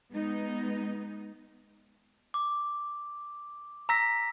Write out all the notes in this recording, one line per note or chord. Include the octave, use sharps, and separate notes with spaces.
G#3 B3 D#4
D6
A#5 E6 A#6 B6